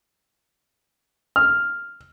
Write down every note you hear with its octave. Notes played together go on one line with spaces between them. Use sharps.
F6